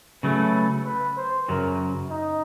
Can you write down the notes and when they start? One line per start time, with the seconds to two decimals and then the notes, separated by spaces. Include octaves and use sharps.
0.23 C#3 F#3 A3 B4
0.86 B4
1.17 C5
1.48 F#2 C#3 F#3 A#4
2.11 D#4